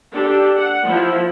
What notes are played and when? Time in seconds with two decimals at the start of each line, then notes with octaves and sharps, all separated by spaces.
0.11 D4 G4 A4
0.56 F#5
0.86 F3 E4